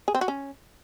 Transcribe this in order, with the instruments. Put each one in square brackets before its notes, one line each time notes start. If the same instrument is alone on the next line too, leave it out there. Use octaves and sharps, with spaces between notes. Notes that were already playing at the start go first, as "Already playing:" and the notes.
[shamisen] G#4
C4
F#4
C#4